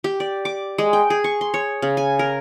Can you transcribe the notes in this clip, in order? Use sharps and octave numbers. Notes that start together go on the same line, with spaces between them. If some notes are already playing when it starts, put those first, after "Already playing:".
G4
D5
D6
G#3
G5
G#4
C#6
C6
C#5
C#3
G#5
A#4